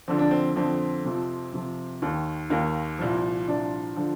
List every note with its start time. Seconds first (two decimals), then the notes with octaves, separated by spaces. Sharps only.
0.08 F2 D3 F3 C4
0.19 D4
0.31 C4
0.56 F2 D3 F3 C4
1.05 F2 C3 F3
1.53 F2 C3 F3
2.02 D#2 D#3
2.50 D#2 D#3 A#3
2.99 C2 A#2 F3
3.48 C2 A#2 F3 D4
3.97 D3 F3